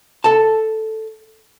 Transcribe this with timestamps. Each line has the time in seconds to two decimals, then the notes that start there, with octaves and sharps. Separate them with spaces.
0.24 A4 A5